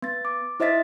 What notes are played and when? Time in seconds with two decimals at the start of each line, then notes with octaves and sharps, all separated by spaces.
0.02 B3 A6
0.25 D6
0.60 E4 C5 D#5 E5 A6 B6